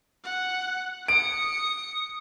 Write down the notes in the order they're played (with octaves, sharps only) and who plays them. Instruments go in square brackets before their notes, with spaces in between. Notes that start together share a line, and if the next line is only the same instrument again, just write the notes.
[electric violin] F#5
[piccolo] D#6 [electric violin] C#7 [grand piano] D7